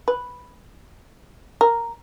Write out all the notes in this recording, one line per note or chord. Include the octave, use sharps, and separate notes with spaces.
B4
A#4